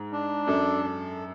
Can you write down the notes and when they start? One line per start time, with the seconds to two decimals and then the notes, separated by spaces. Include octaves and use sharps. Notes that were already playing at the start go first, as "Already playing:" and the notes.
Already playing: G#2
0.12 D4
0.48 F#2 A4
0.84 A4